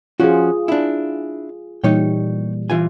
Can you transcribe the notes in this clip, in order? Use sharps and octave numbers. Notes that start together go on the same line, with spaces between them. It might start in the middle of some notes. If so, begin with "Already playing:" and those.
F3 C#4 F4 F#4 G#4
D4 E4
A#2 E3 G3 D#4 C#5 G5
E3 F4 G#5